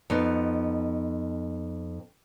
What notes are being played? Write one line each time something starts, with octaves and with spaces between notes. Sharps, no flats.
F2 B3 D#4